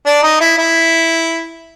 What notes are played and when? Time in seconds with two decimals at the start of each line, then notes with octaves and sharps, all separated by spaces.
0.06 D4
0.23 D#4
0.41 E4
0.58 E4